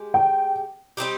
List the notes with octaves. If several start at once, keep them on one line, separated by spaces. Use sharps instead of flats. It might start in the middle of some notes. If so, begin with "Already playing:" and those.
Already playing: G#3 G4
G5
G3 C4 D#4 G4